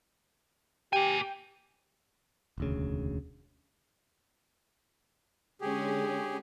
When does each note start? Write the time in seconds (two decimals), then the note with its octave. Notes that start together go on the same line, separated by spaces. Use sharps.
0.93 A#3 G4 G5 G#5
2.58 E1 D2 C#3
5.61 D3 G#3 C#4 G4 G#4